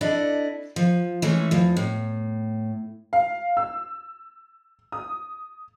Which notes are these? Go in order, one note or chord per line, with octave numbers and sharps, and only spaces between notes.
D4 E4 A4 D5 D#5
F3
E3 G#3 A3 C#4
E2 F3
A2
F5
E6
D#6